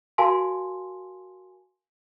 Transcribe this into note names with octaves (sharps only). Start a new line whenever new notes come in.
F#4 A#4 F5 G#5 A5 C6